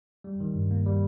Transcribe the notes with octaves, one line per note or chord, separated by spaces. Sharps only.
G3
D#3
G2
A#3
G3